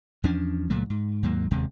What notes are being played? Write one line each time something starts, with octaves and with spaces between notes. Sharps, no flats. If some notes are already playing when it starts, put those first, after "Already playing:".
E2 F3 C#4 D4
C#2 A#2 F#3 A3
G#2
D#2 G#2 F#3 A#3
E1 D#2 C3 G#3